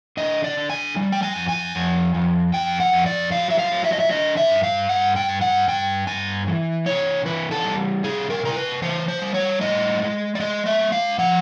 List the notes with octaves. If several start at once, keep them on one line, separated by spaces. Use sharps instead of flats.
D3 D#5
D5
D3
G#5
G3
G5
G#5
F2
G#5
F2
F2
F2 G5
F#5
F2
D5
F#3 F5
E5
F5
F#3
E5
D#5
E5
D3 D#5
E5
G2
F5
G2 F#5
G5
G2
F#5
G2 G5
G2 G#5
E3
C3 C#5
E3 B4
A4
G3
C3 G#4
A#4
C3 A#4
B4
E3 C5
C5
G3
C#5
A2 D#5
G#3
D5
G#3 D#5
E5
G#3
F5
F3 F#5